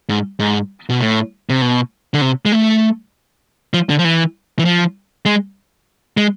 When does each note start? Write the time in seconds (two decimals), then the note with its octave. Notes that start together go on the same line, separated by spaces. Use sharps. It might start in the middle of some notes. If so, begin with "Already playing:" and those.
0.09 G#2
0.40 G#2
0.90 B2
1.01 A2
1.49 C3
1.62 B2
2.14 D3
2.21 C3
2.45 G#3
2.52 A3
3.74 F3
3.89 D3
3.99 F3
4.05 E3
4.59 E3
4.65 F3
5.25 G#3
6.17 G#3